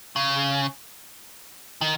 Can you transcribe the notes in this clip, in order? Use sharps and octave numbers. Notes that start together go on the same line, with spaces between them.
C#3
D#3